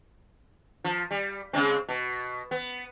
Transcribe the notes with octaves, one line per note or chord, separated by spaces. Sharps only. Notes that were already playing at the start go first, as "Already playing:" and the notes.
F3
G3
C#3 G#3 C4
B2
B3